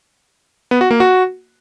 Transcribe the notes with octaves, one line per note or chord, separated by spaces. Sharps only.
B3
F#4
A#3
F#4